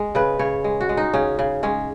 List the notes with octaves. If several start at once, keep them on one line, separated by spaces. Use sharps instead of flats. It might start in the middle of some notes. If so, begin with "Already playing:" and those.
Already playing: G#3
C#3 B4
C#3 C#5
G#3
F#4
G#3
D#4
C#3 C#4
C#3
G#3 C#4